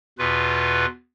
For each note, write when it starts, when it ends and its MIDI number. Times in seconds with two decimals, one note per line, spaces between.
0.18 0.86 40
0.18 0.86 47
0.18 0.86 65
0.18 0.86 71